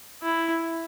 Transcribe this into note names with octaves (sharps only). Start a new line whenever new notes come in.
E4